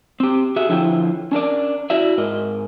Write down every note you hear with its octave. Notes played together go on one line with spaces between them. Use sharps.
C4 G4
F#4 G#4 E5
D3 F3 E4 F4 C#5 G5
C#4 D4 A#4 D5
E4 F#4 D5 E5
G#2 A#4 D#5